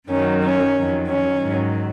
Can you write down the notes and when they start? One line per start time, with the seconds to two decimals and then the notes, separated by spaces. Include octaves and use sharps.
0.08 F#2 D#3 F#3 C#4
0.41 C#4
0.75 F2 D#3 F#3
1.07 C#4
1.41 G#2 D#3 F#3